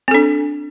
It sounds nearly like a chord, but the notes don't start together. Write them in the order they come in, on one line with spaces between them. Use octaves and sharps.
C4 A4 D4